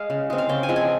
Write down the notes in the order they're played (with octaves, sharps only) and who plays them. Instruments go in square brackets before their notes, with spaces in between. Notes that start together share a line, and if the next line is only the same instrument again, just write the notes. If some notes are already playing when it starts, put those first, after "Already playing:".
Already playing: [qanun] G#3 F5
C#3
G#3 C4
F5
C#3 G5
G#5
F3 G#3 C4
G#5